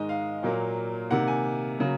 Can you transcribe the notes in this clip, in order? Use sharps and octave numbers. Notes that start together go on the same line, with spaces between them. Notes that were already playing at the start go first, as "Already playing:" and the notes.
Already playing: G#2 D#3 G#3 D#5
F5
A#2 F#3 A#3
C3 D#3 A#3 F#5
G#5
C#3 F#3 A#3